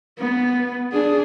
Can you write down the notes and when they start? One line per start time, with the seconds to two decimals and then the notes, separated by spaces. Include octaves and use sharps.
0.19 B3
0.92 D4 G#4